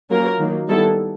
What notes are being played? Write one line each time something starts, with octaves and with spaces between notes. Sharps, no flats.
F#3 A#3 C#4 F4 A#4
D#3 F#3 A#3
D#3 G3 B3 E4 A4